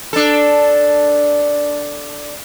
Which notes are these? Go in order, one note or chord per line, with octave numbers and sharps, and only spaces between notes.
D4 A4